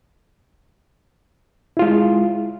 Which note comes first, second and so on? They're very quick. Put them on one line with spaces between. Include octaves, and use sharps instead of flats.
E4 F4 G#3